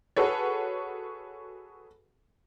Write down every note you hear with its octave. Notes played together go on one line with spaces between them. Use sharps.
F#4 G#4 A4 B4 C#5